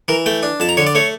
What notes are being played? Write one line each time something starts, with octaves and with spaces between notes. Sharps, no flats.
E3 A#4
A3 G5
D4
F2 A5
A#5
D3 C#5
D5
A3 C#5